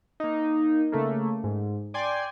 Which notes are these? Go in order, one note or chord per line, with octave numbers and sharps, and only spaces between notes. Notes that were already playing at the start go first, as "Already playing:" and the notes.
A#3 D#4
C#3 A3 A#3
G#2
D5 G5 G#5 C6